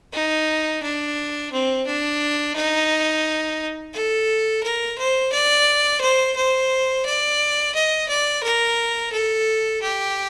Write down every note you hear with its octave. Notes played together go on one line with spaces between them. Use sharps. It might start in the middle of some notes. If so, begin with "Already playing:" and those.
D#4
D4
C4
D4
D#4
A4
A#4
C5
D5
C5
C5
D5
D#5
D5
A#4
A4
G4